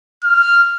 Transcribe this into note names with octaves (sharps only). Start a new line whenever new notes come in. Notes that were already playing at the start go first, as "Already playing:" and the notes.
F6